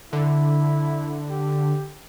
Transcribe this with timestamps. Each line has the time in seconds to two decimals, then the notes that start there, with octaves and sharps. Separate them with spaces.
0.13 D3 E4
1.30 G4